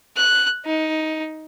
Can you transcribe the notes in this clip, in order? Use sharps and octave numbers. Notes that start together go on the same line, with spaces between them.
F#6
D#4